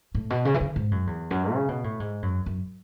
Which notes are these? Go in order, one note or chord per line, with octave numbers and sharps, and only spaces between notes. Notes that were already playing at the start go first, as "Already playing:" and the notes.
A2
B2
C#3
E3
D3
G#2
F#2
E2
F#2
C#3
B2
A2
G#2
F#2
F#2